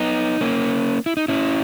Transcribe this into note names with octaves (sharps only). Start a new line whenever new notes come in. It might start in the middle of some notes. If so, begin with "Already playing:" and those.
Already playing: B3 D#4
A#3 C#4
E4
D#4
C#4 E4